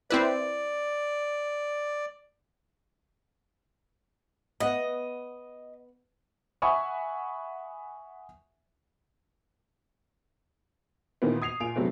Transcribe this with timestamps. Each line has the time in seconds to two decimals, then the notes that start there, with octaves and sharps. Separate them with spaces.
0.10 C4 E4 B4 D5
4.60 B3 D#5 F#5
6.62 E5 F#5 G#5 B5 C#6 D#6
11.22 A#2 D#3 E3 A#3 B3
11.42 D#6 G#6 C7 F7
11.60 A#2 F4 G#5 D7 F7
11.76 G2 C3 F#3 A3 B3